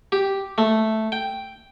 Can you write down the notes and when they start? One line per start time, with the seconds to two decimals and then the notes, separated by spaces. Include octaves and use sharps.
0.12 G4
0.58 A3
1.12 G5